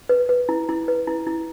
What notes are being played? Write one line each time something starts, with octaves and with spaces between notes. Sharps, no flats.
B4
B4
E4
E4
B4
E4
E4